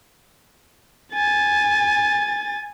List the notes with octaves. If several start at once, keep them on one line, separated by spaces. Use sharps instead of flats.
G#5 A6